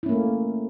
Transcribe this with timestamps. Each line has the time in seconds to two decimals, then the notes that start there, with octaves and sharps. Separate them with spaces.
0.03 E4
0.06 C#4
0.09 A#3
0.12 A3